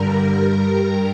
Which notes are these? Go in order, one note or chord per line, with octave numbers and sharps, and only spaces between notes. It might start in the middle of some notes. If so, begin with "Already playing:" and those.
Already playing: G2 D3 G3 A#4 A#5
G2 G3